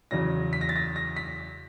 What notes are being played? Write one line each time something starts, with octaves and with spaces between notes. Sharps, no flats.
E2 C#3 F#3 A#6
B6
A#6
A6
A#6
A#6
B6